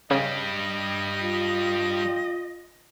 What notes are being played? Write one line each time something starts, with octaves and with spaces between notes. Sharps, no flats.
G2 C#3 G3 D#5
F4